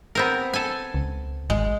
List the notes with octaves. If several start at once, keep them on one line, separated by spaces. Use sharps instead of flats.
B3 C4 A#4
A4 G#5
C#2
G#1 G#3